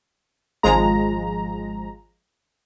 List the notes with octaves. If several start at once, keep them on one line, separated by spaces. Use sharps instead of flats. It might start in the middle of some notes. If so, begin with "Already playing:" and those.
G#1 F3 G#3 A#5